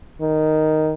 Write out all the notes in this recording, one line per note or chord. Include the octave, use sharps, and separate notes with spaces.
D#3